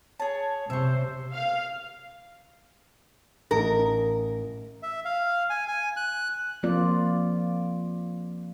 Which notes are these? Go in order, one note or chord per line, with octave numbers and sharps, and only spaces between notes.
G#4 C#5 A5
C3 C5 E5 C#6
F5
A1 D#4 A#4 A5
E5
F5
G#5
G#5
F#6
F3 A#3 C4 F4 D5